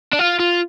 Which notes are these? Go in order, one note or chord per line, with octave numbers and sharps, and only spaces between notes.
D4
F4
F4